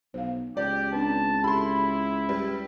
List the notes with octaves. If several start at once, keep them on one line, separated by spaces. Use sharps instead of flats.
B1 C5 F5
C#2 G4 D5
C4 D4 B4 A5
E4 G4 A4 B5 C6
G3 B4